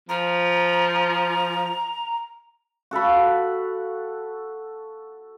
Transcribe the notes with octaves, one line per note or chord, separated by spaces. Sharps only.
F3 A#5
F#4 A4 F5 B5